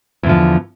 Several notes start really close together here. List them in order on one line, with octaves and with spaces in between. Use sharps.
E2 D3 F3